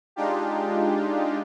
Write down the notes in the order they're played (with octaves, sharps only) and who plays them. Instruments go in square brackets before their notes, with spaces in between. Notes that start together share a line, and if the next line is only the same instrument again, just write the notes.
[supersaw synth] G#3 D4 D#4 F4 G4